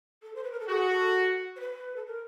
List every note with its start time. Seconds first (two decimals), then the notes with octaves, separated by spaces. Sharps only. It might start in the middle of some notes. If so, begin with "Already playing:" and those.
0.23 A4
0.35 C5
0.43 B4
0.52 A#4
0.60 A4
0.68 F#4 G#4
0.91 A4
1.56 C5
1.60 B4
1.96 A4
2.06 A#4